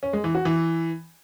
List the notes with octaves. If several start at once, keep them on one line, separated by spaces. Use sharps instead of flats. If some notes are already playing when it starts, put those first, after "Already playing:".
C#4
G#3
E3
F#4
E3